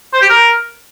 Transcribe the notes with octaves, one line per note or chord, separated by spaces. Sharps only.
C5
G4
A#4